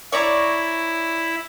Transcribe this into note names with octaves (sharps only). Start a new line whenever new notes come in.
E4 C#5 D5 A#5